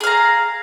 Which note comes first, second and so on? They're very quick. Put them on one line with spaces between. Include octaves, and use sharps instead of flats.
G#4 F5 A#5